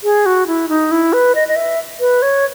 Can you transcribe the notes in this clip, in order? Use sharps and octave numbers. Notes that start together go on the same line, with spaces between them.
G#4
F#4
E4
D#4
E4
B4
D#5
D#5
E5
B4
C#5